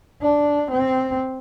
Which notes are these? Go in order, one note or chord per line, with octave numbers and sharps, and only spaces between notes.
D4
C4